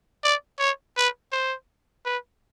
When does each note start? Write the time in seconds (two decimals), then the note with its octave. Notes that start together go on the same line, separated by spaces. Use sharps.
0.24 D5
0.59 C#5
0.97 B4
1.32 C5
2.06 B4